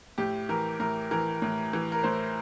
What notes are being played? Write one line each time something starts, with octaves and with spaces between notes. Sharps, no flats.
A2 G4
E3 A#4
A2 A#4
E3 A#4
A2
E3
A#4
A2 C5